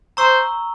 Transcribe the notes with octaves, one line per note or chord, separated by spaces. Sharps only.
C5 A#5 C#6 E6